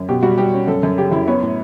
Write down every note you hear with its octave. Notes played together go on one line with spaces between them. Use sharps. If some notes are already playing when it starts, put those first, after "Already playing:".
Already playing: F#2
B2 G4
G3 F#4
G3 G4
C#4
F#2 A4
F#2
C#3 G4
F#2 E4
B3 C#5
A2